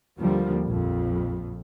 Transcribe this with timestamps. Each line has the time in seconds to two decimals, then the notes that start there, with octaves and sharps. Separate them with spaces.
0.18 D#2 D3 F3 G3 A#3
0.65 A#1 F2